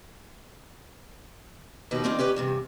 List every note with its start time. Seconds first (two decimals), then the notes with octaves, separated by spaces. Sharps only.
1.91 D#2 B2 D#4 B4
2.04 E3 A#3 C4 D#4 F4 D5
2.19 C#4 G4 B4 D5
2.36 E2 G2 C3